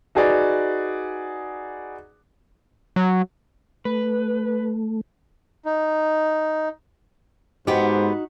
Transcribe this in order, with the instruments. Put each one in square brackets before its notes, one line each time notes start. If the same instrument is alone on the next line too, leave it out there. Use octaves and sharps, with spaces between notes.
[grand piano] D#4 F#4 G#4 B4 D5
[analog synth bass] F#3
[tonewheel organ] A3 [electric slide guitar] B4
[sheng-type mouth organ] D#4
[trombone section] G#2 [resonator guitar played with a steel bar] B3 G4 [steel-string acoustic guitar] D#4 F#4 [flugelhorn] C5